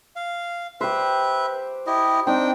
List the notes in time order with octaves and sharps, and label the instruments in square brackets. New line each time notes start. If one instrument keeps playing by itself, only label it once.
[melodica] F5
[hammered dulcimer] G4 C5 [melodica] B4 E5
[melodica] E4 G4 D#5
[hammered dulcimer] C4 D#4 [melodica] D4 G5